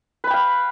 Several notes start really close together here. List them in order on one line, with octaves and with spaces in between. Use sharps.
B4 B5 G5 F5